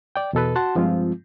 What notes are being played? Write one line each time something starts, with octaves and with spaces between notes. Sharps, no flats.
D5 G5
E2 B2 A4 B4
F#4 F#5 A5 C6
G2 F3 G#3 C4 F4